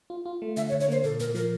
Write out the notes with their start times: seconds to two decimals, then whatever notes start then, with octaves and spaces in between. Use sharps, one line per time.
0.10 F4
0.26 F4
0.42 A3
0.57 D3 E5
0.69 C#5
0.72 D3
0.80 C#5
0.88 A#3 C5
1.04 A#2 A4
1.20 A#2 A#4
1.35 F3 A#4